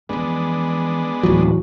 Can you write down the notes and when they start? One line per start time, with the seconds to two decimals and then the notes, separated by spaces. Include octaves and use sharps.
0.09 F2 E3 G#3 B3 D4
1.23 D1 D2 E3 F#3